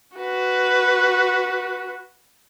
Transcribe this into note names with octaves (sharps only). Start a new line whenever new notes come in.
F#4 B4